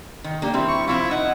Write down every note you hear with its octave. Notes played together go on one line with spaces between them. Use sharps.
D#3
A#3 D4 G4
G3 C4 E4
C#6
F3 C4 E4 F4
D#4 F#5